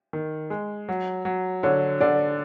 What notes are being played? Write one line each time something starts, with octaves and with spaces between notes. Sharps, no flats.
D#3
G#3
F#3
F#3
D3 C#5
D3 D5